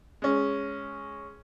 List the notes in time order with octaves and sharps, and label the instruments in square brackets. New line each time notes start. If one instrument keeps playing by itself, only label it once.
[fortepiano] G#3 C#4